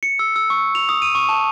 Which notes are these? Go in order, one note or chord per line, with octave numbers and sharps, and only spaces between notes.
C#7
E6
E6
C#6
F7
D#6
D#7
C#6
A5